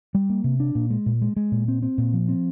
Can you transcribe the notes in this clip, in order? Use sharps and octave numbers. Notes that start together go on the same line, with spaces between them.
G3
A#3
C3
D4
A#2
G#3
A#2
G#3
G#3
A#2
C4
C4
A#2
F3
C4